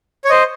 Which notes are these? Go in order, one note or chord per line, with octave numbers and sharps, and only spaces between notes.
C#5
C5 D#5